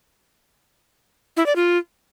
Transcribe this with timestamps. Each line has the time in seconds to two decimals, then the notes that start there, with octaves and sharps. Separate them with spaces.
1.37 E4
1.46 D5
1.56 F4